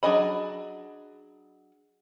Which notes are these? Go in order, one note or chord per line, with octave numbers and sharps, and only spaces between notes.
F#3 D4 G#4 D#5 B5